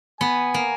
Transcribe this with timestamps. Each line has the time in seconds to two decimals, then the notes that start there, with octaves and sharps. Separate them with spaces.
0.21 B3 G#5
0.54 A#3